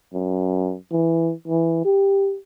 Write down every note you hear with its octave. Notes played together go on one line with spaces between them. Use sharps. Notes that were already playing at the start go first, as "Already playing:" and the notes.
F#2
E3
E3
G4